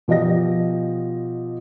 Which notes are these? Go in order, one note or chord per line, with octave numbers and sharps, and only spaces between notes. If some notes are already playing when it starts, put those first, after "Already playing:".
B2 F3 G4 D#5 A#6